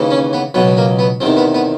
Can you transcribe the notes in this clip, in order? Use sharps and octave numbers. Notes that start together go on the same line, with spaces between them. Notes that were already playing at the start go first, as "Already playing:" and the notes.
Already playing: D#2 C#3 E3
C#4
B3
C#2 B2 F#3 B3
A#3
B3
E2 C3 D#3 C4
B3
B3